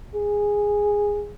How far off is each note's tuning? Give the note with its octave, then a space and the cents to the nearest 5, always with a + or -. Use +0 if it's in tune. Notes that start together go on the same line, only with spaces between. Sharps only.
G#4 -10